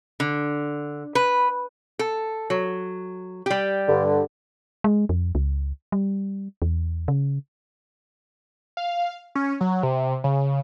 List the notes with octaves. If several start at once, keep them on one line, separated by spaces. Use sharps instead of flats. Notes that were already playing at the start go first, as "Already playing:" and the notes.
D3
B4
A4
F#3
G3 G4
G2 D3
G#3
F2
C#2
G3
E2
C#3
F5
C#4
F#3
C3
C#3